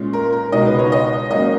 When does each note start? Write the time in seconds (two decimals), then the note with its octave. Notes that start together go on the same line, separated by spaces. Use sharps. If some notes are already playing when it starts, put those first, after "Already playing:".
Already playing: A#2 G#3 C#4
0.13 A#4
0.32 A#4
0.52 C#2 B2 G#3 D#4 D#5
0.66 B4
0.79 C#5
0.92 D#5
1.30 G#2 F#3 A#3 C#4 D#5